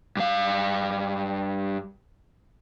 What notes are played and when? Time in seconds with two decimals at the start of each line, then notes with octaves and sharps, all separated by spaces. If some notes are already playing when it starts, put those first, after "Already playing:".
0.17 G2 F5